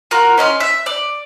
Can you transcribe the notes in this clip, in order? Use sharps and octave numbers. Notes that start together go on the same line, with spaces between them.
F4 F#4 A#4
C#4 D#5 E5 C6
E5
D5